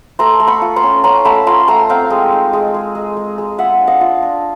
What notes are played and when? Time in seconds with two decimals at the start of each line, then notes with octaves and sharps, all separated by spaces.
0.19 A3 A#5 C6
0.40 A3
0.47 B5 C#6
0.62 F4
0.76 A#5 C6
0.83 C#4
1.04 C#4 A#5 C6
1.25 A3 A5 B5
1.47 F4 A#5 C6
1.68 A3 A#5 C6
1.89 C4 F5 G5
2.10 G#3
2.32 D#4
2.53 G#3
2.74 G#3
2.95 G#3
3.17 G#3
3.38 G#3
3.59 F4 E5 F#5
3.80 D4
3.87 D#5 F5
4.01 F4
4.22 D4